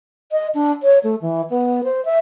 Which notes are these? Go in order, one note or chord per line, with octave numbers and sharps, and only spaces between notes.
D#5
D4
C#5
A3
E3
B3
C5
E5